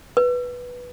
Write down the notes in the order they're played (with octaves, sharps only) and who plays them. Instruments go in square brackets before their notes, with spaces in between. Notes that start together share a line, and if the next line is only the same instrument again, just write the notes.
[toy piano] B4